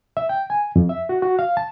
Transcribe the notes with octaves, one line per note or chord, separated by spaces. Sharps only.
E5
G5
G#5
F2
E5
F#4
F#4
F5
A5